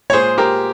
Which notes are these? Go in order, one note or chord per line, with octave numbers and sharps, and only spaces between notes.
C#5
A#2 G#3 G#4 C5
G4 A#4